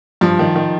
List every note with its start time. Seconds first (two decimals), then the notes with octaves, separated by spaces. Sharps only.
0.21 G2 F3
0.39 D#3
0.56 D#3